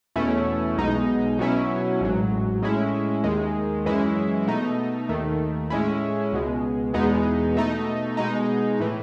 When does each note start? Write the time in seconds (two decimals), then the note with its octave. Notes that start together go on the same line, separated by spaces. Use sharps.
0.16 E2 B2 A3 C#4 E4
0.77 B1 B2 G#3 D#4
1.39 B2 F#3 C#4 E4
2.01 A1 G#2 F#3
2.62 A2 G#3 C#4 E4
3.24 D#2 D#3 G#3
3.85 F#2 E3 G#3 C#4 E4
4.47 B2 A3 D#4
5.09 D#2 D#3 A3
5.70 A2 G#3 C#4 E4
6.32 C#2 B2 G#3
6.94 E2 B2 G#3 B3 D#4
7.55 B2 A3 D#4
8.17 B2 G#3 D#4
8.80 A2 E3